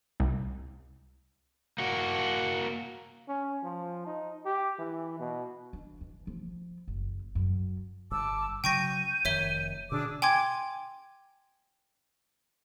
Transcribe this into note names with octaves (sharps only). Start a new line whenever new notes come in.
C2
A#3 F#4
C#4
F3
D#4
G4
E3
B2
D4
E3
F3
F#1
F#2
G1 A5 D6 E6
C#3 F#3 G5 C#6 G6 A#6 D#7
F1 D#3 C#5 E5 G7
B2 D3 D4 G#4 D6 E6
G5 G#5 C6 D6 G#6